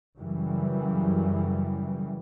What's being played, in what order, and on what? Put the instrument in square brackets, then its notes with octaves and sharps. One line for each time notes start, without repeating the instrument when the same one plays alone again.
[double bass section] F#2 C#3 E3 G3